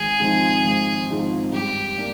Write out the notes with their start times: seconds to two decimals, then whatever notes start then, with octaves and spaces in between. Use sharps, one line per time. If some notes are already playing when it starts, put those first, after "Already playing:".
Already playing: G#1 G#4
0.20 G#2 F3 C4 D#4
0.64 G#1
1.09 G#2 F3 C4 D#4
1.53 G2 G4
1.98 A#3 D4